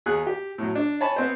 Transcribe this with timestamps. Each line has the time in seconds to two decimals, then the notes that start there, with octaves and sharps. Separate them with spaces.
0.06 D#2 G#4 F#6
0.27 G4
0.58 A2 F#3
0.75 D4
1.01 C#5 G#5 A5 B5
1.16 B3 C4 C5